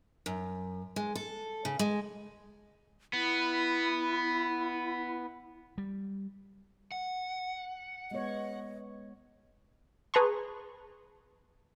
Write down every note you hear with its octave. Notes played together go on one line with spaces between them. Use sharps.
F#2
G#3
A4
C#3
G#3
B3 E4
G3
F#5
G#3 B3 C#5 D#5
G#4 B4 A5 A#5 C6 C#6